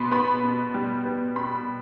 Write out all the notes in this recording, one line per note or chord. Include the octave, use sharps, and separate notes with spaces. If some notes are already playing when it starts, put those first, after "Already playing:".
Already playing: B2 B3 B5 C6
B3 B5
B2
G3
B3
B2 B5